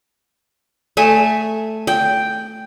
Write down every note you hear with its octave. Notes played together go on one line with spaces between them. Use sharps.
A3 E5 G#5
G5